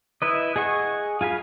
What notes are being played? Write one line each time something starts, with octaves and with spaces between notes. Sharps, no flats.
E4 B4 D#5
G#4 D#5 F#5 C#6
F4 G#4 F5 B5